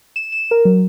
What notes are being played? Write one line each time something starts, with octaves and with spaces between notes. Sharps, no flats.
E7
E7
A#4
F#3